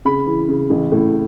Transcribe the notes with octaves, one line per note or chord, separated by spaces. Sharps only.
C#3 B5
E3
C#3
A1
A2